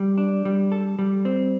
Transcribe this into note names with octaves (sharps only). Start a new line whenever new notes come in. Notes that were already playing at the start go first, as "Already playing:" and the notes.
Already playing: G3
D4
G3
A4
G3
C4